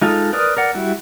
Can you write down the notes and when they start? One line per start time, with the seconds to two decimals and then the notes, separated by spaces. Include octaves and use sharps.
0.01 G#3 D#4 F4 A4
0.33 A#4 B4 D5 D#6
0.57 A#4 D5 F#5
0.75 G3 E4 F#4